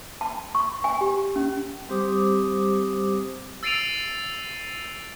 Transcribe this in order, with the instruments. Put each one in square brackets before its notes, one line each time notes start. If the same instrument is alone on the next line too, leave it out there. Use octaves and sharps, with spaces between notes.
[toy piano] A5
C#6
G#5
G4
C#4
[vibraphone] G3 C4 G4 C5 D6 D#6
[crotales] E6 A6 C7 D7 D#7 F7